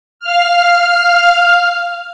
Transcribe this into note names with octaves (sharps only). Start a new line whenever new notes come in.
F5 F6